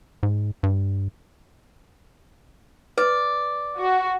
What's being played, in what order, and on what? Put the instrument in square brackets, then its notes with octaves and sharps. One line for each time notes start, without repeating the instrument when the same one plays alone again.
[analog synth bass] G#2
G2
[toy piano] B4 [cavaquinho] D5
[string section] F#4